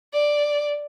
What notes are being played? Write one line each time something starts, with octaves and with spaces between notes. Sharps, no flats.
D5